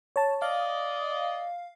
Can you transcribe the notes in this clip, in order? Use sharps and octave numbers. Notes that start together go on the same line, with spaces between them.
C#5 A5
D5 D#5 F5